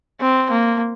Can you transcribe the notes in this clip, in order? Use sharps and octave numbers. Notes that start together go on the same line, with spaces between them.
C4
A#3